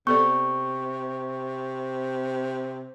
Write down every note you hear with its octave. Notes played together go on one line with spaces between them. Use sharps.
C3 B3 A4 D5 C#6